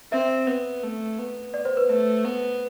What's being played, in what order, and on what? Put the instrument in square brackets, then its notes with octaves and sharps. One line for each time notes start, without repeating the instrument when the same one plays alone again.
[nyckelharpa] C4 [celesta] E5
[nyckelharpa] B3
A3
B3
[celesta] D5
C5
B4
[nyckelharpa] A3 [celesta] B4
[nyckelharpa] B3